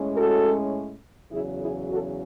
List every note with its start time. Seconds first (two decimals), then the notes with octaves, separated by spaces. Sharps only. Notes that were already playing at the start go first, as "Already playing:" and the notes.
Already playing: A2 G#3 C#4
0.15 F#4 A4
1.31 E2 C#3 F#3 E4 G#4
1.60 E4 G#4
1.89 F#4 A4